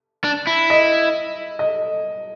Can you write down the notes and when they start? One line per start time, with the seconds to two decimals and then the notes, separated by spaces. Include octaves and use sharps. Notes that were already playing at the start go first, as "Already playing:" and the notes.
0.24 D4
0.47 E4
0.70 D#5
1.59 D#5